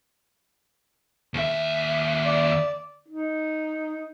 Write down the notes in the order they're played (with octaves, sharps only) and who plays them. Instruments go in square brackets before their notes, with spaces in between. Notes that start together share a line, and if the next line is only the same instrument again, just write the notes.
[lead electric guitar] D#2 E5
[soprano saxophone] D5
[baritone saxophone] D#4